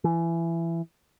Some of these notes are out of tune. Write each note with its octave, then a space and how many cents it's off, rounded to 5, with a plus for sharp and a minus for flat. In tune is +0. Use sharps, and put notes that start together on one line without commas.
E3 +20